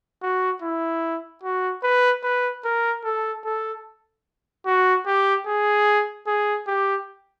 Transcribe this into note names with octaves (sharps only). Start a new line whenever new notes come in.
F#4
E4
F#4
B4
B4
A#4
A4
A4
F#4
G4
G#4
G#4
G4